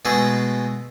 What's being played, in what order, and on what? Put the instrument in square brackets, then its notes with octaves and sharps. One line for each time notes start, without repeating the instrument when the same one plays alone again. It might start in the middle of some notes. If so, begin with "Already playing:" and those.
[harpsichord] B2 G#3 A3 G#4